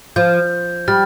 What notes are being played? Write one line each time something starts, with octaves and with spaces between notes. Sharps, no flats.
F3 G6
G3 F6 A6